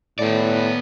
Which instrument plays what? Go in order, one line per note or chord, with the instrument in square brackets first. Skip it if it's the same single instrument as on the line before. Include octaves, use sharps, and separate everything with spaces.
[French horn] A2 [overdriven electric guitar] B3 D5